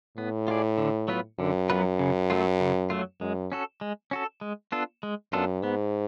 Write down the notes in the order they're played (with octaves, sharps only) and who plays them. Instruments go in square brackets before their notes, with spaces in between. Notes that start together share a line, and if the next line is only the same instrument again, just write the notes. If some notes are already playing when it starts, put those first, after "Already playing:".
[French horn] A2 [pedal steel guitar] B3
[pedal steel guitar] F4 G#4 D5
D3
F#3 B3 F4 B4
[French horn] F#2 [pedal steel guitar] D3
[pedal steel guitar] F#3 B3 F4 B4
C#3
F#3 A3 F4
C#3
F#3 A3 F4
[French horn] F#2 [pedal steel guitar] G#3
[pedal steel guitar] C#4 F#4 A4
G#3
C#4 F#4 A4
G#3
B3 D4 F4 A4
G#3
[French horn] F#2 [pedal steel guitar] B3 D4 F4 A4
[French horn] G#2 [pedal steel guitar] B3